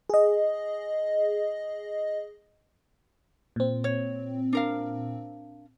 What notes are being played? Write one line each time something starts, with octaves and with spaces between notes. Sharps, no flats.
G#4 D#5
A#2 C4
C#5
D4 A#4 F5